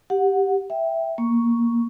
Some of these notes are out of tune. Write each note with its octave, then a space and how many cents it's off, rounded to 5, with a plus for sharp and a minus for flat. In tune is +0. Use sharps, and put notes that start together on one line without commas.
G4 +0 F#5 -15
E5 +0 G5 +0
A#3 +10 C#6 +0